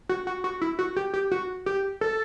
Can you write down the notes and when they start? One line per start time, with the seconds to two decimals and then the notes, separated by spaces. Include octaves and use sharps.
0.09 F#4
0.27 F#4
0.44 F#4
0.61 E4
0.79 F#4
0.96 G4
1.14 G4
1.31 F#4
1.66 G4
2.01 A4